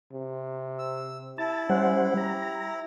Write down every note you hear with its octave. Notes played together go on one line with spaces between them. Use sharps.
C3
E6
E4 A5
G3 C#4 C5 F#5
G4 A#5